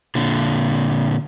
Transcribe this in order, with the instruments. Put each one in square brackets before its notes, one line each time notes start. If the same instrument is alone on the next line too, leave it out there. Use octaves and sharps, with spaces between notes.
[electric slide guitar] A#2 D3